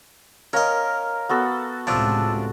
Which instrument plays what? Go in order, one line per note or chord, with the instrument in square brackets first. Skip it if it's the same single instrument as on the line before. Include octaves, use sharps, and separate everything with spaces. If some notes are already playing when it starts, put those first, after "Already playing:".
[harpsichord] C#4 D#5 [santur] A#4 [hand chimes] F5 A#5 F6
[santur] B3 F#4 A4
[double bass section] C#2 A2 C3 [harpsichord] F3 D4 [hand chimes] A5 D6 E6